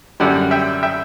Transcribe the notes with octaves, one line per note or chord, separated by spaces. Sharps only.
F#2 D3 G3 D5 F#5
E5 G5
E5 G5